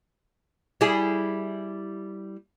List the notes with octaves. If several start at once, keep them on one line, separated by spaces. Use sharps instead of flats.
G3 E4 G#4